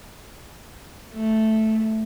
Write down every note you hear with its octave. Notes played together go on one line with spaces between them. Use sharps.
A3